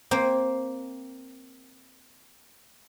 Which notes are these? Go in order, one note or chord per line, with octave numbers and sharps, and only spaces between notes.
A#3 C4 C5